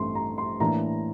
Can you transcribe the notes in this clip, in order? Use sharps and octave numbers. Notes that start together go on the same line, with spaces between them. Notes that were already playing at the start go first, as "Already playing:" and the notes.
Already playing: A1 G2 E3 A3 C4 C6
A#5
C6
A2 E3 A#3 D4 A#5